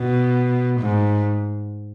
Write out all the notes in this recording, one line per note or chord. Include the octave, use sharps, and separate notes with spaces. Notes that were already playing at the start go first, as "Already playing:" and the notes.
Already playing: B2
G#2